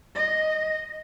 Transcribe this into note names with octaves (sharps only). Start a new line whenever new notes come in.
D#5